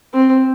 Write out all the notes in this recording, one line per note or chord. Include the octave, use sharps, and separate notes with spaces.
C4